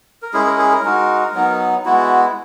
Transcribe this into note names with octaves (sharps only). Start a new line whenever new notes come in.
A#4
G#3 C#4 E4 G#4
A#4
G#4
A#4
G#3 D#4 F#4
F#3 B3 D#4
G#3 B3 E4 F#4